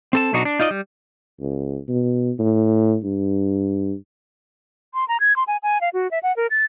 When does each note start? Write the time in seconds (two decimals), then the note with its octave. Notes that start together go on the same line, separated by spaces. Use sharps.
0.13 C4 A4 A5
0.33 B1 B2 D4 D#4 F#4
0.45 D4
0.60 D#4 F4 D5 D#5
0.71 G3
1.40 C#2
1.88 B2
2.39 A2
3.04 G2
4.94 C6
5.08 A#5
5.20 G#6
5.36 C6
5.47 G#5
5.63 G#5
5.81 F5
5.94 F#4
6.11 E5
6.23 F#5
6.37 A#4
6.51 A6